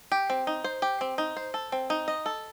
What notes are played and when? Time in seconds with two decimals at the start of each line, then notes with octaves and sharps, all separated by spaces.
0.12 G4
0.30 C4
0.47 D#4
0.64 C5
0.82 G4
1.01 C4
1.18 D#4
1.37 C5
1.54 A4
1.72 C4
1.90 D#4
2.08 D#5
2.26 A4